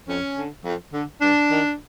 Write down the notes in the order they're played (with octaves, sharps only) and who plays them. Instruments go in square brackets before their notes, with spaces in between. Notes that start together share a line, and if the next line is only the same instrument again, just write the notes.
[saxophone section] F2 C#4
D3
F2
D3
G2 D4
D#3